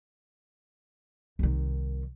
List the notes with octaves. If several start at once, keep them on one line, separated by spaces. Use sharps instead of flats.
C2 D#3